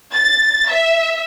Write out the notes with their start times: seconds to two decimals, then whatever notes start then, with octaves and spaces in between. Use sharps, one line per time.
0.14 A6
0.70 E5